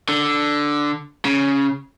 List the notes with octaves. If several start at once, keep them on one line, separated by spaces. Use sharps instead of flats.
D3
C#3